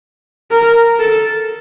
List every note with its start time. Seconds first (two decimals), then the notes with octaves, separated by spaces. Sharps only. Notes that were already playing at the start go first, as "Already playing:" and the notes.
0.51 A#4
0.99 A4